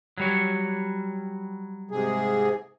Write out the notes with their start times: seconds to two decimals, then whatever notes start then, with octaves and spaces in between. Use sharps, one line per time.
0.18 F#3 G3 C#5
1.91 G#2 C3 G#4